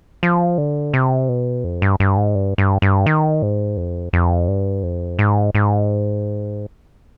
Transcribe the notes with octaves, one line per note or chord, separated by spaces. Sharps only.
F3
D3
C3
B2
F2
G2
G2
G#2
G2
G2
G2
D#3
G#2
F2
F2
G2
F2
G#2
G#2